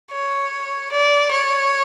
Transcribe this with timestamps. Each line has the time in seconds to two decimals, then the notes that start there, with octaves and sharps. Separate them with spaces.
0.12 C#5
0.92 D5
1.32 C#5